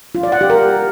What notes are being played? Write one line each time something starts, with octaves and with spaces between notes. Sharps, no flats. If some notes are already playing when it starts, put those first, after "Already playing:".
F4
D5
F#5
G4
A#4